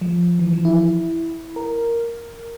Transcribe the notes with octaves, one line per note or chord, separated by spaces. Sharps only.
F3
E3
F3
E4
E4
A#4